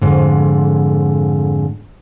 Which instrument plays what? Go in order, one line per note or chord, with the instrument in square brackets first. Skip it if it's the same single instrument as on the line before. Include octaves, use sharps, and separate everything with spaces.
[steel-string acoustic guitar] F2 G#2 D3